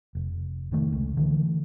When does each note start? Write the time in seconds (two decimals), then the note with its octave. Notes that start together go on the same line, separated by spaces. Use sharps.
0.15 F1
0.72 F1 D#3 A3
0.93 C#2
1.17 D3 E3 A3